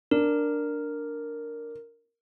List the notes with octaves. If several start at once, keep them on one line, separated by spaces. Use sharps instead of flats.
D4 A#4